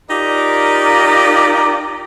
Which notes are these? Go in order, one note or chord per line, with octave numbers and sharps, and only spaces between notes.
D#4 F4 G4 A#4 D5